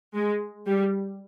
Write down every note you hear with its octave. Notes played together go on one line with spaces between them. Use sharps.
G#3
G3